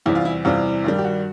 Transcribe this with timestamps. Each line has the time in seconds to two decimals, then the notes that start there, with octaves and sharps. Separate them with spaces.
0.06 E2 C3 E3 G3 E4
0.15 F4
0.25 E4
0.45 E2 C3 E3 G3 F4
0.84 G2 D#3 G3
0.99 G4
1.04 F#4